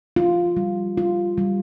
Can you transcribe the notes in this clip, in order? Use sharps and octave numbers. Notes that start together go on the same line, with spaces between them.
F4
G3
F4
G3